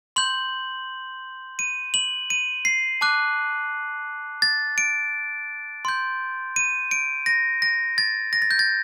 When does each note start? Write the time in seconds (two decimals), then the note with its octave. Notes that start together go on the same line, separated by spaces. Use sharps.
0.16 C6 G6 F#7
1.59 D#7
1.94 F#7
2.30 D#7
2.65 C7
3.01 A5 D6 F#6
4.42 A6
4.78 D7
5.85 C6 G6
6.56 D#7
6.91 D7
7.26 A#6
7.62 A#6
7.98 A6
8.33 A#6
8.42 A6
8.51 G6
8.59 A6